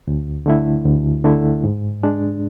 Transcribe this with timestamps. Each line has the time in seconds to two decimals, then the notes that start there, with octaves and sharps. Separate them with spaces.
0.07 D2
0.46 D3 A3 E4
0.86 D2
1.24 D3 A3 E4
1.64 G#2
2.03 G#3 D4